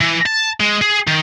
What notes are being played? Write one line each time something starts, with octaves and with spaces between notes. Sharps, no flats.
E3
A5
G#3
G#4
D#3